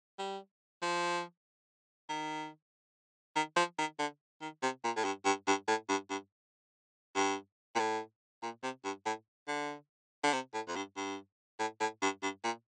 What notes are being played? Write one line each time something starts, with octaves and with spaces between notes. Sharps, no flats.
G3
F3
D#3
D#3
F3
D#3
D3
D#3
C3
A#2
A2
G2
G2
G2
A2
G2
G2
G2
A#2
A2
A#2
C3
G2
A2
D3
D3
C3
A2
F2
G2
G2
A2
A2
G2
G2
A#2